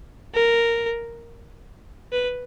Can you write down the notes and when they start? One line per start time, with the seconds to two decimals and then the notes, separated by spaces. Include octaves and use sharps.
0.35 A#4
2.13 B4